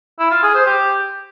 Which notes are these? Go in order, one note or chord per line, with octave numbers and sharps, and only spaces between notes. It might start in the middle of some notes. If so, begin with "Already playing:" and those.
E4
F4
G#4
C5
G4